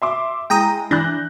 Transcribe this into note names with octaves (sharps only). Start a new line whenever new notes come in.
E5 C6 D6
G#3 E4 G5 A#5 D#6
E3 D4 F#6 G6 A#6